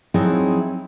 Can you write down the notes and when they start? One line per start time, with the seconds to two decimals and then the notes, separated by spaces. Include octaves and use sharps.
0.14 F3 F#3 C4 D#4 E4 G#4